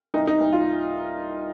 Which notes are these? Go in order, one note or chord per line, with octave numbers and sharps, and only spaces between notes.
C2 D#4
D#4
C2
F4